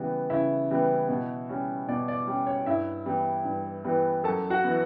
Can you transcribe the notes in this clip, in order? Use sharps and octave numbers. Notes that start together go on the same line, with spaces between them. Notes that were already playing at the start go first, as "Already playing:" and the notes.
Already playing: C#3 E3 G3 B3
C#3 E4 E5
E3 G3 B3
B2
G3 C#4
B2 D5
D5
G3 C#4
C#5
G2 E4 E5
E3 G3 B3
G2
E3 G3 B3
F#2 A4 A5
F#4 F#5
E3 B3